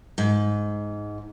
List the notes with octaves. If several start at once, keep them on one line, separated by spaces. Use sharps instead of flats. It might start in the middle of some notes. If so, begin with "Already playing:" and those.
G#2